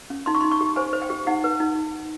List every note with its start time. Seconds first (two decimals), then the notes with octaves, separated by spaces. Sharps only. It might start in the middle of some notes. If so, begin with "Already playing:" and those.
0.10 C#4
0.26 D#4 C6
0.35 C#6
0.41 D#4 C6
0.51 C#6
0.61 G4
0.76 C5 G#5
0.93 C5
1.02 G5
1.10 G4
1.27 D#4 F#5
1.44 B4
1.60 D#4